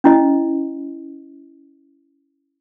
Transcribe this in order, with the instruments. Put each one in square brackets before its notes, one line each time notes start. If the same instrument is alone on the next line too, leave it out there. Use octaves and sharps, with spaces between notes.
[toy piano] C#4 E4 D#5